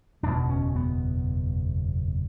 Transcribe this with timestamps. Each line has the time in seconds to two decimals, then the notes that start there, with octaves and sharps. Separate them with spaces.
0.23 F#1 E2 B2 D4
0.49 C#4
0.76 B3